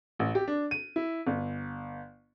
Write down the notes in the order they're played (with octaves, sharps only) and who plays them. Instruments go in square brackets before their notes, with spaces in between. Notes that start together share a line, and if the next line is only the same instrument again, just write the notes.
[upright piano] A1
G4
D4
D#7
E4
G1